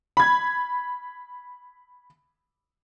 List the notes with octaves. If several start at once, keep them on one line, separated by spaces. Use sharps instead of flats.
B5 G#6